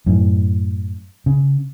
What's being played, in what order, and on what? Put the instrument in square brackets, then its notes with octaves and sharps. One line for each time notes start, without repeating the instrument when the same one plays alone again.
[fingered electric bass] F#2 A2
C#3